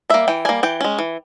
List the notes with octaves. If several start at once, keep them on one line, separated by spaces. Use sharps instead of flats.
G3 A#3 E5
E3 G5
G3 A#3 G#5
E3 G5
G#3 C#4
E3